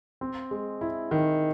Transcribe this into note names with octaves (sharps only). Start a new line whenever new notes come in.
C4
G#3
E4
D#3